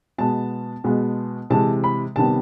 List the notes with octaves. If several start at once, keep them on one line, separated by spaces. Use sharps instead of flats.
B2 G#3 B3 A5
B2 G#3 B3
C3 E3 G#3 A5
B5
C3 D#3 G3 B3 A5